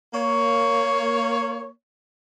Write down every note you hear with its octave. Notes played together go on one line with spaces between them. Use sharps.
A#3 C#5